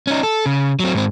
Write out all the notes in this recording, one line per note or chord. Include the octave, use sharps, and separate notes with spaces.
C#4 D#4
A4
C#3
F#3 C4
G#2 C4